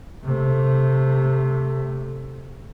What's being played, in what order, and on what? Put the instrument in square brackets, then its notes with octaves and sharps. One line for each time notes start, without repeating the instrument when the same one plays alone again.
[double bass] C3 A3